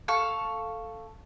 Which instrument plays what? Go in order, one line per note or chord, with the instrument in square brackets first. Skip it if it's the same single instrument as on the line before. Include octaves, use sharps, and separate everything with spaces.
[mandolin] A4 F5 C#6